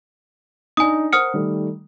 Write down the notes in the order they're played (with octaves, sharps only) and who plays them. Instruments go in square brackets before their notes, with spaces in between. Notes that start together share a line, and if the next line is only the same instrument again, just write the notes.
[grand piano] D4 D#4 [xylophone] G#5 D#6
[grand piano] A#4 C5 F#5 [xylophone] D#6 F6 C#7
[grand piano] D#3 G3 A3